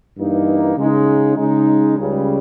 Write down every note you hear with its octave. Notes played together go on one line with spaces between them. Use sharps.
G2 E3 A#3 D#4
C#3 G#3 D#4
C#3 G#3 D#4
C#2 C#3 G3